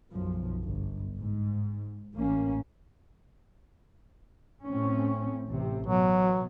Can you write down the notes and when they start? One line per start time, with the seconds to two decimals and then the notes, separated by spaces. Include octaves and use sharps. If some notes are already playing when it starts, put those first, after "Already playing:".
0.11 B1 F#2 F3
0.64 G1
1.19 G#2
2.15 A1 A#3 C#4
4.64 A2 C4 C#4
5.48 A1 C3
5.86 B2 F#3